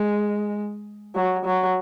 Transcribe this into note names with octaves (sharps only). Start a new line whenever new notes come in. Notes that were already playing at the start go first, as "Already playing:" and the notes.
Already playing: G#3
F#3
F#3